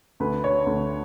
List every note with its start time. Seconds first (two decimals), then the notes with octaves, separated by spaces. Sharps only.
0.20 D2 B4
0.44 C#5
0.67 D2